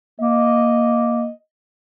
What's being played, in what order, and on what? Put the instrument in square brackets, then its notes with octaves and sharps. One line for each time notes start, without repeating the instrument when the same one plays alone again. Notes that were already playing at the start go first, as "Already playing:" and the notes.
[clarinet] A#3 [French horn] D#5